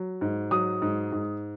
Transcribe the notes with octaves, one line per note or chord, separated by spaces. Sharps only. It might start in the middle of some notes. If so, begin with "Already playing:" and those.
Already playing: F#3
G#2
F#3 D#6
G#2
G#2